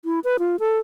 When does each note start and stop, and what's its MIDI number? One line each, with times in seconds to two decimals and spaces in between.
0.05 0.20 64
0.24 0.37 71
0.39 0.56 65
0.60 0.79 69